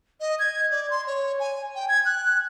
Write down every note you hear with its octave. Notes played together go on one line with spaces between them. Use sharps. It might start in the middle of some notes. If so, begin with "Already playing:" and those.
D#5
G#6
D5
C6
C#5
G#5
G5
G#6
F#6